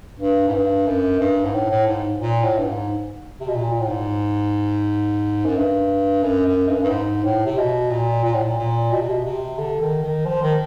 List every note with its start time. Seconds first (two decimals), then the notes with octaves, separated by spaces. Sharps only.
0.20 G2
0.49 G#2
0.53 G2
0.86 F#2
1.20 G2
1.45 G#2
1.54 A2
1.71 A2
1.87 G#2
2.20 A#2
2.43 A2
2.58 G2
2.65 G#2
3.40 C3
3.48 B2
3.55 A#2
3.72 A#2
3.81 A2
3.88 G#2
5.45 F#2
5.56 G2
6.23 F#2
6.46 F#2
6.68 G2
6.75 F#2
6.82 G2
6.90 G#2
7.24 A2
7.46 C3
7.57 B2
7.91 A#2
8.24 A#2
8.33 A2
8.42 A#2
8.58 A#2
8.92 B2
9.01 C3
9.10 B2
9.25 C3
9.58 D3
9.81 D#3
10.03 D#3
10.26 F3
10.42 D#3